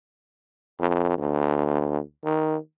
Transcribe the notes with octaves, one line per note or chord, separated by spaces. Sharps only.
F2
D2
D#3